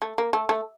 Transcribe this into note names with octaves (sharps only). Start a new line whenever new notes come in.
A3
A#3
A3
A3